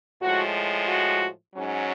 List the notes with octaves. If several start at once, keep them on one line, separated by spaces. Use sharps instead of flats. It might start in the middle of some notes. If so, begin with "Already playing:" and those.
A2 F3 G#3 F#4
F#4
G#2 F#3 C#4